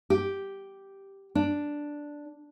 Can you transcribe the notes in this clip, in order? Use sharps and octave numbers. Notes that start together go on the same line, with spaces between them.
G4
D4